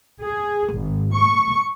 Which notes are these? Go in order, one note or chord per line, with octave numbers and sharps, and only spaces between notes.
G#4
G#1
C#6